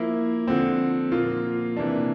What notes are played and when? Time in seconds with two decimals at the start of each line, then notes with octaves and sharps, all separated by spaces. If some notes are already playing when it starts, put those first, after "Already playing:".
Already playing: F3 A#3 E4
0.48 D3 F3 C4
1.12 A#2 F3 A#3 F4
1.77 C3 E3 A#3 D4